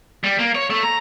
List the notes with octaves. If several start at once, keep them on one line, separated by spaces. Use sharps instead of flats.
G3
A#3
C#5
A3
A#5